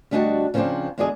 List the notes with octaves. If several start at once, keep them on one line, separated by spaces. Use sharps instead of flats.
D2 G3 D4 F#4 D#5 A5
C#3 F3 G#3 B3 C4 D4
E2 D3 G#3 D4 F4 G#4